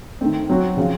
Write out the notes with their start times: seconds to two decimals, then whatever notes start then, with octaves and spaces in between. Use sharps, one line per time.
0.21 D#3 A3 C4
0.50 F#3 C4 F#4
0.77 C#3 F3 C4 F4